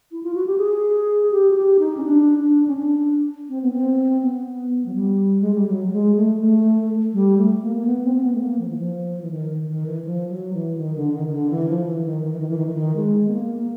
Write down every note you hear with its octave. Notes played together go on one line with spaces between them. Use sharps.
E4
F4
F#4
G4
G#4
G4
F#4
G4
D#4
C#4
D4
D4
C#4
D4
C4
B3
C4
B3
F#3
G3
G#3
G3
F#3
G3
G#3
A3
A3
G3
A3
A#3
A#3
B3
C4
C4
B3
A3
A#3
F3
E3
F3
E3
D#3
D#3
D#3
E3
F3
F#3
E3
D#3
D3
D#3
D#3
D3
E3
F3
E3
D#3
D#3
E3
D#3
E3
D#3
E3
D#3
G#3
B3
A#3
A#3